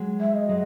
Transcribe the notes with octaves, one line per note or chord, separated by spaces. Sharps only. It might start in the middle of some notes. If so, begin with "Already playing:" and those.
Already playing: F#3 G#3
E5
D#5
F#3 G#3